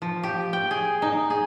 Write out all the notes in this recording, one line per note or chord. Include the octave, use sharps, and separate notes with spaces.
F3
G4
G5
G#4
D#4
G#4